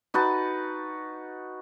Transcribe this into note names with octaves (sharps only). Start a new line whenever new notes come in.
D#4 F#4 B4 A5